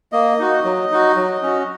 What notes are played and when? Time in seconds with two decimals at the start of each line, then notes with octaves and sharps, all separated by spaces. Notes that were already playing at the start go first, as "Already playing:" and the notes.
0.12 A#3 D#5
0.39 D#4 F#4
0.65 F#3
0.91 D#4 F#4
1.16 F#3
1.43 C#4 F#4